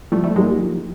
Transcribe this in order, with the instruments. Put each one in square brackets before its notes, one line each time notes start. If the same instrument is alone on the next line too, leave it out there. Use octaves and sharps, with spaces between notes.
[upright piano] F3 [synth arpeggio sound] G3 A3
[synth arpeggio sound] G3 A3
[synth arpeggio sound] F#3 G#3 [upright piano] A#3 D#4 G4
[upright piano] F3